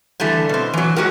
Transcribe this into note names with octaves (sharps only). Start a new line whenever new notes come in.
D3 E3 G3 A3
B2 C4
E3 F#3
G#3 F#4 G4 A#4